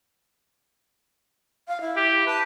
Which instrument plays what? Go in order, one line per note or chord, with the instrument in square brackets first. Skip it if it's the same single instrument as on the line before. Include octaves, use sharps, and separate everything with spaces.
[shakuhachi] F5
E4
[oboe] G4
[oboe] B4 [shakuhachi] A5